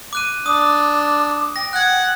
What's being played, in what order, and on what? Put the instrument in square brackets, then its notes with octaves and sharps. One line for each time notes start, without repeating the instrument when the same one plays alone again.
[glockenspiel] D6 F#6 D#7
[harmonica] D4 [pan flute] D6 [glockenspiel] D#6
[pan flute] G5 [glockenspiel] A#6
[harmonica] F#5 [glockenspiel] F#6 G#6